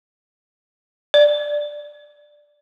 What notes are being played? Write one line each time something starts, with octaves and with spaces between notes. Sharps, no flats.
D5